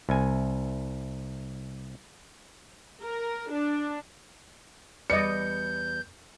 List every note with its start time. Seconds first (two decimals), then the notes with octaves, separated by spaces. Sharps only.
0.09 C2 G#5
3.03 A#4
3.52 D4
5.10 E2 G3 B4 D5 D#5 G6 C#7